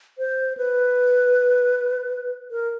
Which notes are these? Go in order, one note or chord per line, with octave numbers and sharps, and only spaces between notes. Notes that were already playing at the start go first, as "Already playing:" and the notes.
C5
B4
A#4